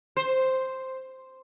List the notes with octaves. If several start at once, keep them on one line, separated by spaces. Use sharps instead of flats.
C5